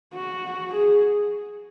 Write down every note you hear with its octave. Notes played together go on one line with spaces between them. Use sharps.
F#4
G#4